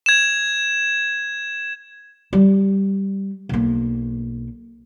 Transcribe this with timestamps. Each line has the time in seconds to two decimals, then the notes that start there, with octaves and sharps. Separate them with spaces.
0.06 G#6 E7
2.33 G3
3.49 B1 A#3